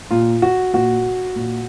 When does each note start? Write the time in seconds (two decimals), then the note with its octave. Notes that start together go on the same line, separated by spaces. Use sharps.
0.11 A#2 F4
0.42 F#4
0.74 A#2 F#4
1.36 A#2